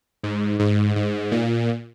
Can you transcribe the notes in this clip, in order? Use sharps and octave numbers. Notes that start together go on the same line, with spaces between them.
G#2
G#2
G#2
A#2